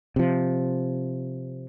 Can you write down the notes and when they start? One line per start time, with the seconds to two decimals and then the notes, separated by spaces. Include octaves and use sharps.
0.16 C3 F3